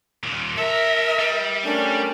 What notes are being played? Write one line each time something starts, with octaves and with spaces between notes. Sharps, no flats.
D#2 A#2
A4 A#4 E5 A#5
G3
A3 C#4 D4 A#4